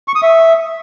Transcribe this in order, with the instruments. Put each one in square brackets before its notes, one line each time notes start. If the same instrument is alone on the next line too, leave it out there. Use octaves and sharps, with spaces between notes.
[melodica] C#6
D#6
E5